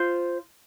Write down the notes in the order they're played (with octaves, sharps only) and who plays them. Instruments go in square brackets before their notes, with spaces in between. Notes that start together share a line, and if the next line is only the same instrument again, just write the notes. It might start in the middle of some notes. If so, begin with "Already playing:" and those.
Already playing: [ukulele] F4 C5